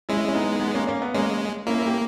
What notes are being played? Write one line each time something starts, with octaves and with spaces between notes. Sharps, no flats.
G#3 C#4 E4
C#4
B3 D#4
B3
A#3 C#4
A#3 C#4
B3
G#3 A#3 C#4
A#3 C#4 E4
E4
G4